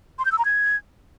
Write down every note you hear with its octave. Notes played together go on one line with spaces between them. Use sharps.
C6
G6
E6
A#5
G#6